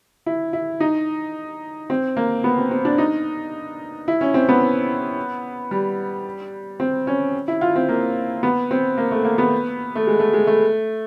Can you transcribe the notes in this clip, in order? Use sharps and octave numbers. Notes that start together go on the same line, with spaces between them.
E4
E4
D#4
C4
A#3
B3
C4
C4
D4
D#4
E4
C#4
C4
B3
G3
C4
C#4
E4
F4
C4
A#3
B3
C4
A#3
A3
A#3
B3
A3
G#3
A3
G#3
A3